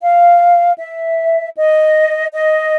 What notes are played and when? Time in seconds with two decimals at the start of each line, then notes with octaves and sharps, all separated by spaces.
0.01 F5
0.79 E5
1.56 D#5
2.33 D#5